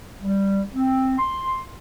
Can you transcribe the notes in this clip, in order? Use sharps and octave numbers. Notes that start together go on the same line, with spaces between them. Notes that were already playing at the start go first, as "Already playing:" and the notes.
G3
C4
C6